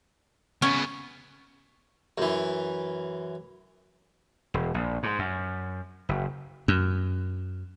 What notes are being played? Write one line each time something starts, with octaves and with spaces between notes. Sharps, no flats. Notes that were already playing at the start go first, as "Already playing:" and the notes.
C#3 B3 C#4
F#2 E3
E1
A#1
G#2
F#2
F#1
F#2